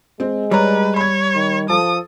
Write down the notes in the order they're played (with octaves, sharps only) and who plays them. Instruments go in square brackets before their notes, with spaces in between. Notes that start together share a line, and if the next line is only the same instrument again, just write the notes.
[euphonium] G#3 [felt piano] C4
[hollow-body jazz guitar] G3 [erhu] B4 [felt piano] C#5 D5 A#5
[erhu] C#5 [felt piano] B5 G#6
[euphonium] D#3
[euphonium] F3 [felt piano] A4 [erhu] D#6